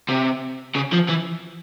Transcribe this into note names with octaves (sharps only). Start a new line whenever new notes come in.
C3
C#3
F3
E3